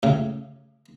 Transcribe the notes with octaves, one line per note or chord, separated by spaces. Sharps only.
A2 C#3